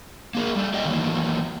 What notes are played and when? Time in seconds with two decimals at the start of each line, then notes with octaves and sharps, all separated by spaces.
0.35 A#3 G#4 A#4
0.55 G3 A3
0.74 G4 D5 D#5 F5 G5
0.85 D#3 E3 F#3 A#3